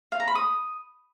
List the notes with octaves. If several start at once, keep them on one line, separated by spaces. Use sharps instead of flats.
F5
A#5
B5
D#6